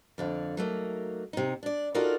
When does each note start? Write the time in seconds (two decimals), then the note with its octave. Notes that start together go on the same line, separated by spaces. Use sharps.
0.18 F2 D3 F5
0.57 F#3 A3 A#3 D#4
1.33 C3 D#4
1.63 D4 D5
1.95 D#4 F4 F#4 A4 A#4 D5